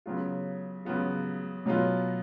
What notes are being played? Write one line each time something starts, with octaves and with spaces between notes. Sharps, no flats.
C#3 F#3 B3 F4
C#3 F#3 B3 F4
B2 F#3 B3 F4